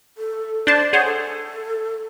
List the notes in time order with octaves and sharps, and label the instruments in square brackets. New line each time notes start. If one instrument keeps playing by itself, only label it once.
[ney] A4
[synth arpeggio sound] D4 C5 A5 [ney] D5
[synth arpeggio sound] G#4 C5 C#5 [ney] F#5
[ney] A4